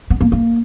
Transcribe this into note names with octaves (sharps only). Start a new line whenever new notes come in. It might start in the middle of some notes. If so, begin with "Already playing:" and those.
B3
A#3
A#3